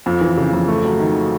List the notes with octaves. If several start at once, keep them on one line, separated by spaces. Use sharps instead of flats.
F2
E3
C#3
F2
A3
F#3
D#3